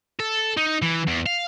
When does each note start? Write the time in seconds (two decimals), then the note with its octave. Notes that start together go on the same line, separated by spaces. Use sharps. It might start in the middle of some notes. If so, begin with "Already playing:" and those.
0.20 A4
0.57 D#4
0.82 E3
1.08 E2
1.26 F5